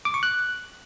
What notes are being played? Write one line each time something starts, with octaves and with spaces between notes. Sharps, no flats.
D6
C#6
F#6